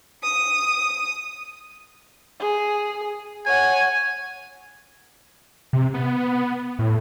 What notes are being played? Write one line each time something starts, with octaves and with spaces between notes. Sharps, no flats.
D#6
G#4
C#5 F#5 G#5
C3
B3
A2